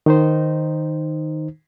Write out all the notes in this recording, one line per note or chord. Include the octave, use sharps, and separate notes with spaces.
D#3 D#4 C5